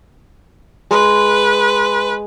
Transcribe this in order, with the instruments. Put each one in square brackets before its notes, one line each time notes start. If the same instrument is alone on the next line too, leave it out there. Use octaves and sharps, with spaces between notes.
[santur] G#3 [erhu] B4